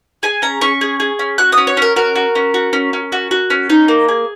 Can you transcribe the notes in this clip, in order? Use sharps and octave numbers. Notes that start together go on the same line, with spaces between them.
G#4 G#5
C#4 A#5
C#4 C#6
G#4
G#4
C#4
F#4 F#6
D#6
C#4
C#5
C#4 A#4
F#4 A#4
F#4
C#4
F#4
C#4
C#4
F#4
F#4
C#4
D#4
A#3
G#4